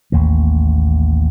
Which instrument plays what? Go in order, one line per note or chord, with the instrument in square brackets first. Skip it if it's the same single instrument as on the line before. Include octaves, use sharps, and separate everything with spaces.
[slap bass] A1 D#2 A3 A#3